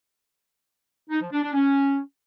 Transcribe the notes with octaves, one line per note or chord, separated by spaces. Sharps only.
D#4
F3
D4
D4
C#4